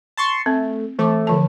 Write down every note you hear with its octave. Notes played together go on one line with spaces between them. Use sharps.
A5 C6 C#6
A3 C4
E3 A3 D6
D3 F3 A5